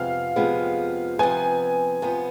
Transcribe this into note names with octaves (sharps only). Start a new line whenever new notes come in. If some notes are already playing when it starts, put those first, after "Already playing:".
Already playing: F2 C3 F3 G#3 B3 F5
F2 C3 F3 G#3 B3
C3 F3 B3 G#5
C3 F3 B3